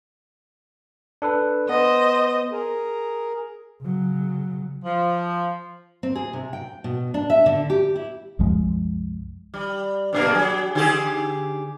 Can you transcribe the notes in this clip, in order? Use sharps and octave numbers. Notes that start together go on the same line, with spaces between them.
D4 A4 B4
B3 C5 D#5
G#4 A#4
C#3 F#3
F3
C4
G#4
C3
G5
B2
D4
E5
D3
G4
E4
C2 F#2 F3 G#3
G3
G2 A#2 A#3
F#3 G#4
D3 G4 G#4